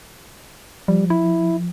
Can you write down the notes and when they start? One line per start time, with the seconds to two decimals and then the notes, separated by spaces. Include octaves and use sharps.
0.88 F3 G3
1.10 E4